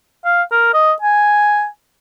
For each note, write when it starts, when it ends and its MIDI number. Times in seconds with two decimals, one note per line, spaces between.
0.25 0.42 77
0.52 0.73 70
0.74 0.93 75
1.02 1.66 80